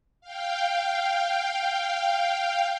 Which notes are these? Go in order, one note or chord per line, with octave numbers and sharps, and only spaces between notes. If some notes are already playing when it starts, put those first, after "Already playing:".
F5 G5